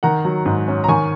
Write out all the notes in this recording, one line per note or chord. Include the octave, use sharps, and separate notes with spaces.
D#3 F#5 A#5
F#3
G#2
C#4
A#5
D#3 G#5 C#6